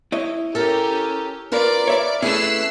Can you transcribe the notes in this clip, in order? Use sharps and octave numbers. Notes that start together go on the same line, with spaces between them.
E4 C#5 D#5
C#4 G4 A4 A#4
F4 A#4 B4 D5
C#5 E5 B5
A3 C#4 E4 G#4 B4 E6 F#6 C7